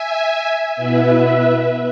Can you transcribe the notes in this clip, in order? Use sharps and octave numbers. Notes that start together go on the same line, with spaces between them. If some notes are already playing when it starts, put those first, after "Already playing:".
Already playing: E5 G#5
B2 B3 E4 B4 E5